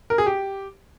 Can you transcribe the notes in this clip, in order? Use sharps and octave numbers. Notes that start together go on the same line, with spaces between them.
A#4
G#4
G4